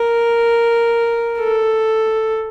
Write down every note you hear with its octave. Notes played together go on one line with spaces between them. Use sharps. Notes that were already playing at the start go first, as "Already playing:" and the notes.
Already playing: A#4
A4